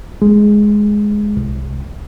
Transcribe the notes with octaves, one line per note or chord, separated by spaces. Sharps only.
G#3
C2